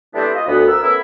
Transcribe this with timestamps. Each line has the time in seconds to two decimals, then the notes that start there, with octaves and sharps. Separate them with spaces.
0.14 E3 G3 A3 B3 C4 D4
0.34 F4 D#5
0.46 D2 B3
0.67 A#4 E6
0.81 A3 B3 C#4 E4